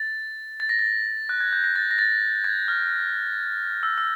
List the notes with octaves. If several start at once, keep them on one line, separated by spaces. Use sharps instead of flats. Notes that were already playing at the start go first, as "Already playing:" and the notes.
Already playing: A6
A6
A#6
A6
F#6
G#6
G6
A#6
A6
A#6
A6
G#6
F6
E6
E6